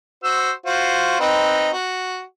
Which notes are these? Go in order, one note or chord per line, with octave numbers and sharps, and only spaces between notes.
F#4 C5 E6
F4 F#4 C5
C4 D#4 B4
F#4